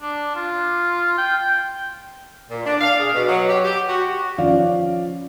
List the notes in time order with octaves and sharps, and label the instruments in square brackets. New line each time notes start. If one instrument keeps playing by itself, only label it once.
[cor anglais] D4
F4
G5
[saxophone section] A#2
D4
F5
G#4
B2
F#3
G4
G4
F#4
[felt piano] F3 C#4 D5 F5